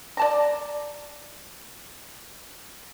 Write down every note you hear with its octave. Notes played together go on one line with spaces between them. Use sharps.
D5 A5 A#5